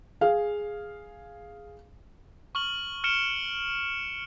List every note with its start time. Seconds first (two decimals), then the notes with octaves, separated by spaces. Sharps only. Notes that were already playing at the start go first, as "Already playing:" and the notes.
0.21 G#4 F5
2.55 C#6 F6 F#7
3.04 F6 C#7 D7 E7 G7